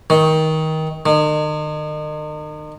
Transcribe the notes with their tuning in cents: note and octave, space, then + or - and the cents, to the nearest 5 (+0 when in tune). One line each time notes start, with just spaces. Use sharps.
D#3 +20
D#3 -40